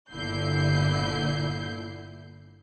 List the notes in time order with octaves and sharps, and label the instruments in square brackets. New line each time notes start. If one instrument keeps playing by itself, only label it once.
[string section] G1 A#2 D3 E4 G6 C7